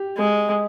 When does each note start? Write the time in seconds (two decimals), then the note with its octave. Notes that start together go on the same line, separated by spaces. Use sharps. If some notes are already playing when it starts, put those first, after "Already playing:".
Already playing: G4
0.17 G#3